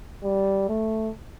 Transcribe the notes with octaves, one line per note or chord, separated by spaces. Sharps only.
G3
A3